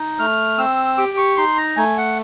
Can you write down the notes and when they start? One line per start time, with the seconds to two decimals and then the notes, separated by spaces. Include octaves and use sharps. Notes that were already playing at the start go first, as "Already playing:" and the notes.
Already playing: D#4
0.19 A3 F6
0.58 C4 E6
0.98 G4 D6
1.17 C#6
1.37 D#4 C6
1.57 A#5
1.77 A3 G#5
1.97 F#5